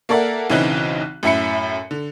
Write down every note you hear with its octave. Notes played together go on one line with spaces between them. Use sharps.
A#3 A4 A#4 D5 E5 F#5
B1 C#3 E3 C4 D#4 F#6
F#2 A2 E4 E5 B5 C#7
D3